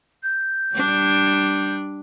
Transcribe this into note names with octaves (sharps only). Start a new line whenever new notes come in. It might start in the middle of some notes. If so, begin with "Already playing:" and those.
G6
G3 D4